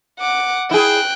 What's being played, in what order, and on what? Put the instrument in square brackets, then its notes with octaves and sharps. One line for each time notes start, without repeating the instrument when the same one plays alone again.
[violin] F#5 D6
[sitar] E4 G#4 [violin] G5 F#6